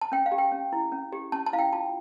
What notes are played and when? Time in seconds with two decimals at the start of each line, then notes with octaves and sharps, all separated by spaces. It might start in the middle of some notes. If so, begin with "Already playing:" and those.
0.01 A5
0.12 C#4 G5
0.26 F5
0.32 G4
0.38 G5
0.52 C#4
0.73 E4
0.92 C#4
1.12 G4
1.32 C#4 A5
1.46 A5
1.53 E4 F5
1.59 G5
1.73 F4 A5